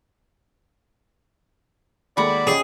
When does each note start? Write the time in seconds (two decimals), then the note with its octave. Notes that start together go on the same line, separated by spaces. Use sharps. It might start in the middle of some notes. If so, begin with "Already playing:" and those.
2.17 D#2 G#3 A3 F#4 D5 B5
2.47 C#4 G4 G#4 D#5